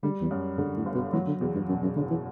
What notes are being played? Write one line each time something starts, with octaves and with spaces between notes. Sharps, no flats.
D3 G3
E2
F#2
G2 D3
A2
G1
B2
E3 F#3
D3
E2 B2
G2
F#2 B2
F#2
F#1 D3
E3